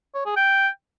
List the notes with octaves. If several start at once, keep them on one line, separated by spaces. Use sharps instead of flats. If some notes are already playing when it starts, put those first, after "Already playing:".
C#5
G#4
G5